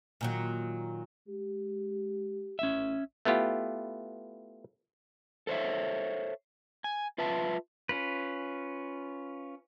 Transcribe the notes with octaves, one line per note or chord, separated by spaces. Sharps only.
A#2 D#3 F#3
G#3 G4
A1 C#4 E5
A3 B3 E4 F4 G4
A4 C5 C#5 E5
G#5
F4 B4 E5 A5
C#4 F4 B4